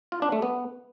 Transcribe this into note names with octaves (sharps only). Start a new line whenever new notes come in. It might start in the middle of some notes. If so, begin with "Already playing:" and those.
F4
D4
A3
B3